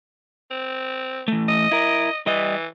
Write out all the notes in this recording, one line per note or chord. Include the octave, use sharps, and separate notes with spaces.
C4
E3 A3
D#5
E4 A#4
E3 G3 D#5